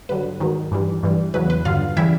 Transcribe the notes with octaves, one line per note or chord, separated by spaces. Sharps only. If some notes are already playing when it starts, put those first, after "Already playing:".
G2 D3 F#3 B4
G#2 D#3 F#3
G2 E3 G3
G2 E3 G3
E2 C#3 F#3 B4
B4
G2 D3 F#3 F4 F5
C#3 E3 G3 E4 E5